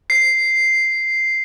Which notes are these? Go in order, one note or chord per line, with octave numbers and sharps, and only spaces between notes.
C7